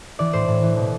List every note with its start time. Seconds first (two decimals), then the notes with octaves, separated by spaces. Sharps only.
0.19 E3 D5
0.33 A2 C5
0.48 A2
0.63 E3
0.77 B2